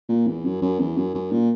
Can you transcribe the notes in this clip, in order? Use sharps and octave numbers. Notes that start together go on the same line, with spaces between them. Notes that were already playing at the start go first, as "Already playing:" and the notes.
A#2
E2
F#2
F#2
E2
F#2
F#2
A#2